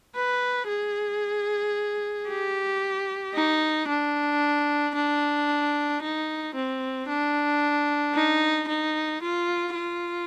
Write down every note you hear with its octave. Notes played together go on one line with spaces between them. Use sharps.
B4
G#4
G4
D#4
D4
D4
D#4
C4
D4
D#4
D#4
F4
F4